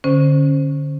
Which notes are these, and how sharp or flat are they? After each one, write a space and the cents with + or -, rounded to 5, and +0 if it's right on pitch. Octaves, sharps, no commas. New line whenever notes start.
D3 +0 C#4 -20 C5 +0